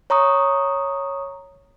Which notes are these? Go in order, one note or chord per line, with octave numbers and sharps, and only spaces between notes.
C#5 A#5 C#6 D#6